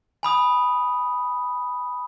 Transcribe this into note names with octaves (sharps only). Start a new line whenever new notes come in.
G#5 B5 D#6